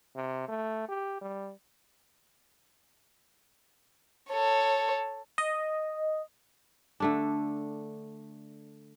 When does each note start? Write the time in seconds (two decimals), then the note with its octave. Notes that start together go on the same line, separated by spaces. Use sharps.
0.17 C3
0.48 A3
0.89 G4
1.22 G3
4.31 A4 C#5
5.38 D#5
7.00 D3 A3 D4